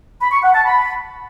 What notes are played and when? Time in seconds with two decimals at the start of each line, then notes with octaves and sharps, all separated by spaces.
0.21 B5
0.32 C#6
0.43 F#5
0.54 A5
0.65 B5